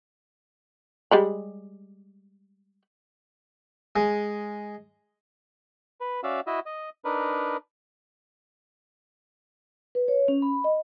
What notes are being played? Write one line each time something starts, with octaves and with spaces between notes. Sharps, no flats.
G3 G#3 B5
G#3
B4
C#4 F#4 D5 E5 F5
E4 F#4 D#5 E5
D#5
D4 D#4 A#4 B4
B4
C#5
C#4
B5
D#5